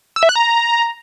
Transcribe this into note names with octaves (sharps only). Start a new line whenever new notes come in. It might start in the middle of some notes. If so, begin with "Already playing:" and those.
E6
E5
F#6
A#5